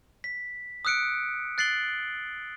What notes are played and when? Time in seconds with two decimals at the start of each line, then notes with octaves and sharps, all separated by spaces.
0.24 B6
0.85 D#6 E6 F#6 C#7 D7
1.58 F#6 A6 C7 D7 F#7 G7